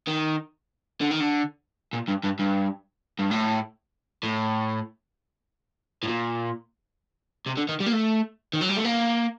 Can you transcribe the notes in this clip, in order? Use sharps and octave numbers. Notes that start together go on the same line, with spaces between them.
D#3
D3
D#3
D3
A#2
G2
G2
G2
G2
A2
A2
A2
A#2
C3
D3
D#3
G3
A#3
A3
D#3
F#3
G3
A3
A#3